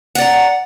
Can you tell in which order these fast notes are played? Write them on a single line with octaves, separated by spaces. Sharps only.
F#5 D5 A#5